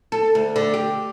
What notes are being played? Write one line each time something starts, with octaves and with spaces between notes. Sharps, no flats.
A4
D2
D3
G4